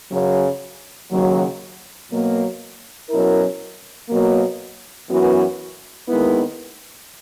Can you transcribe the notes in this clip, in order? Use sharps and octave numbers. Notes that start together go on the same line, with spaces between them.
F#2 C#3 F#3
D#2 C#3 F#3
B2 F#3 A#3
B2 F#3 C#4 E4 A#4
B2 F#3 A#3
F#2 E3 B3 F#4
D#2 D#3 G#3 B3 E4